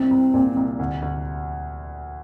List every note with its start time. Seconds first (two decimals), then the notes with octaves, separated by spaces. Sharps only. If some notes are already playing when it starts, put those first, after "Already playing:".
Already playing: C2 C4
0.11 C2
0.34 A#2
0.56 C2
0.79 D2
1.02 D2